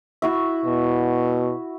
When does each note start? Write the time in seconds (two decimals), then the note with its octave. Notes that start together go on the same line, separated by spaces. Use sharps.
0.22 E4 F#4 E5
0.66 B2